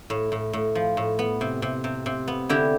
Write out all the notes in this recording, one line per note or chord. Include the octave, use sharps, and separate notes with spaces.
A2
A2
A2
F3
A2
B3
C3
C3
C3
C3
B3
D3 E4 G4